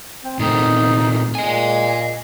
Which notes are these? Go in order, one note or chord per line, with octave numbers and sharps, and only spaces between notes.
C4
A#2 A3 C4 D#4
A#2 D#5 G#5